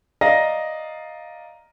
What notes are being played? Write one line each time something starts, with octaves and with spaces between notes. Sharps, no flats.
D5 D#5 F5 A#5 A#6